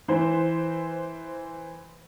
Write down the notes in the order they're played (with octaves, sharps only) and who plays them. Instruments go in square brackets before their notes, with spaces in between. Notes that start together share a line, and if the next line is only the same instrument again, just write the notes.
[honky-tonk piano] E3 C5